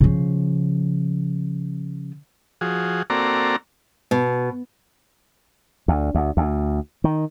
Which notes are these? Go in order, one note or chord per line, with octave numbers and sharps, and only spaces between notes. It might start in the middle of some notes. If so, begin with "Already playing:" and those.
C#3 F3
F3 F#4 G#4
A#3 C4 F#4 A4 D5 A#5
B2
D2
D2
D2
D#3